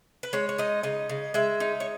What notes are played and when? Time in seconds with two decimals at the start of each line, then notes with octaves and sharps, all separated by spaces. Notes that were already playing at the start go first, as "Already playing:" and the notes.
0.23 B4
0.33 G#3 C#5
0.49 C#5
0.58 D#4 D#5
0.83 C#3 D#5
1.09 C#3
1.34 G#3 E5
1.60 D#4
1.80 C#5